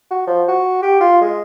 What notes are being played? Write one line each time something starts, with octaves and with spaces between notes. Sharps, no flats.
F#4
F3
F#4
G4
F4
G#3